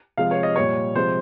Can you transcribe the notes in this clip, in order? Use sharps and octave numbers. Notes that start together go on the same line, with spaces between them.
C3 F3 G#3 F5
C#5
D#5
A#2 G3 C#5
C3 F3 G#3 C5